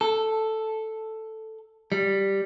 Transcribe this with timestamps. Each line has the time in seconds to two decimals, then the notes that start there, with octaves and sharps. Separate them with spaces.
0.01 A4
1.92 G3